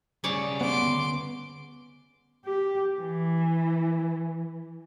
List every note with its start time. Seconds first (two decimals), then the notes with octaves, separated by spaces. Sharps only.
0.24 D2 C#3 G3 C#5 D5
0.61 B3 C6 D6
2.45 G4
2.99 E3